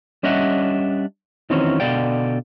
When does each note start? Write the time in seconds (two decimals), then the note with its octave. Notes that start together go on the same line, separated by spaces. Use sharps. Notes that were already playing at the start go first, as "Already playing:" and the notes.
0.23 G3 C#4 D4 D#5 E5 F#5
1.50 D#3 E3 F#3 C4 C#4
1.80 B2 D3 D5 F5 G5